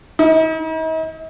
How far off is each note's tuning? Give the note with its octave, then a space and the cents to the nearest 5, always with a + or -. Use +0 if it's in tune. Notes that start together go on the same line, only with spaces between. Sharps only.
D#4 +45